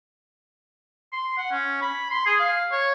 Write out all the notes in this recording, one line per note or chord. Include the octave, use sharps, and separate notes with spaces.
C6
F#5
C#4
B5
C6
G#4
F5
C#5